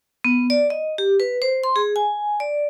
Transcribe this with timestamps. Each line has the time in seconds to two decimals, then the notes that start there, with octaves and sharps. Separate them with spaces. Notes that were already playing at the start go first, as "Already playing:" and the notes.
0.25 B3
0.50 D5
0.70 D#5
0.98 G4
1.20 B4
1.42 C5
1.64 C6
1.76 G#4
1.96 G#5
2.40 D5